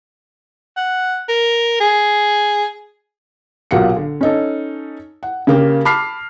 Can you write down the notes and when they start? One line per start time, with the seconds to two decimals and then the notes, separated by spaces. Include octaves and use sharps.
0.76 F#5
1.29 A#4
1.81 G#4
3.71 B1 A#2 F#3 G4 F#5 C#7
3.96 D3
4.21 C#4 D#4 A4
5.23 F#5
5.47 C#3 A#3 G4
5.85 A5 B5 D6 F6 B6 C7